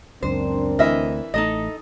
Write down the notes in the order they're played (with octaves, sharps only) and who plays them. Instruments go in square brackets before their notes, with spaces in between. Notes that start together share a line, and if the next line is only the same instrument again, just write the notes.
[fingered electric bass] C#2 F#2 [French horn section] C4 D4 A#4 [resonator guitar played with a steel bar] C5
[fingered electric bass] D2 [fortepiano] E3 E5 F6 [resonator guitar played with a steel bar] D#5
[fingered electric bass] A1 A3 [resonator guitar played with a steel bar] D#4 A4 D#5